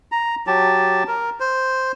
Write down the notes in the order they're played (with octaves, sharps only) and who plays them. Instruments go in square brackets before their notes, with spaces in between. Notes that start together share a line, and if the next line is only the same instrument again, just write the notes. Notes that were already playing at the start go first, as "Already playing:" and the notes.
[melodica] A#5
F#3 G4 A5
A#4
C5